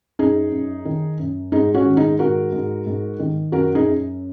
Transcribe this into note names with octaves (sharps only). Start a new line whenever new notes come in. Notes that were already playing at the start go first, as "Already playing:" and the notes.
F#2 D#4 G#4
F#2
D#3
F#2
G#2 D#4 G#4
C#4 F#4
D#3
D#4 G#4
G#2 F#4 A#4
G#2
G#2
D#3
F#2 F#4 A#4
D#4 G#4
F#2